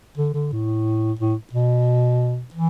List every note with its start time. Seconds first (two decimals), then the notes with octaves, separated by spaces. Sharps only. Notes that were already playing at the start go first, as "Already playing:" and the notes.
0.17 D3
0.34 D3
0.52 A2
1.19 A2
1.53 B2
2.54 E3